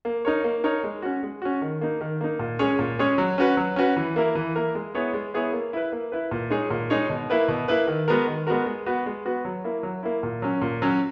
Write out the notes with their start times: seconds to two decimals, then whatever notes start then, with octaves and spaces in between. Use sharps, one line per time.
0.05 A#3
0.25 D#4 A#4 C#5
0.44 A#3
0.64 D#4 A#4 C#5
0.83 G#3
1.02 C#4 F#4
1.23 G#3
1.42 C#4 F#4
1.61 D#3
1.81 A#3 D#4
2.01 D#3
2.21 A#3 D#4
2.39 A#2
2.59 G#3 C#4 G#4 C#5
2.79 A#2
2.99 G#3 C#4 G#4 C#5
3.18 F#3
3.38 C#4 F#4 B4
3.57 F#3
3.76 C#4 F#4 B4
3.97 E3
4.16 A#3 E4 A#4
4.35 E3
4.55 A#3 E4 A#4
4.75 G#3
4.94 B3 E4 G#4 C#5
5.14 G#3
5.34 B3 E4 G#4 C#5
5.53 A#3
5.73 E4 B4
5.92 A#3
6.12 E4 B4
6.31 A#2
6.50 G#3 D#4 G#4 C#5
6.70 A#2
6.90 G#3 D#4 G#4 C#5
7.10 B2
7.30 A#3 E4 B4
7.48 B2
7.68 A#3 E4 B4
7.87 D#3
8.08 G#3 B3 F#4 A#4
8.27 D#3
8.47 G#3 B3 F#4 A#4
8.66 G#3
8.86 B3 F#4 B4
9.06 G#3
9.25 B3 F#4 B4
9.45 F#3
9.64 A#3 E4
9.83 F#3
10.03 A#3 E4
10.23 A#2
10.42 F#3 C#4
10.62 A#2
10.82 F#3 C#4